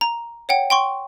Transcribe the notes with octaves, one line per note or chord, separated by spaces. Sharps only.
A#5
C#5 F#5 G5
G5 C6 C#6